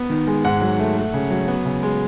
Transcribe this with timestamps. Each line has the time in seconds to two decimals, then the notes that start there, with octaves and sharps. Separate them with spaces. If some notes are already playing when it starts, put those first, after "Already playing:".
Already playing: B3
0.10 D#3
0.27 G#3
0.45 G#2 F#5
0.62 F#3
0.79 A3
0.97 A3
1.14 C#3
1.31 F#3
1.48 B3
1.65 C#3
1.83 G#3